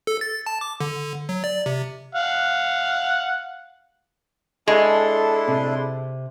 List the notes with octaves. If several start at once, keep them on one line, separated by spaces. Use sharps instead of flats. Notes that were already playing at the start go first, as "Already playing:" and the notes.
A4
A6
A5
D6
D3
F#3
D5
C3
F5 F#5
G#3 D4 E4 A4 C6
C3